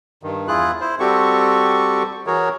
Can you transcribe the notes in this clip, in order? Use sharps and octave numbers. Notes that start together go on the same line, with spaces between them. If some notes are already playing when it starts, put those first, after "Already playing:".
G2 D#3
E2 E4 F4 G#4 F#6
E4 C5
G3 C4 F#4 G4 A4 C#6
E3 F#4 G#4 A#4 C#5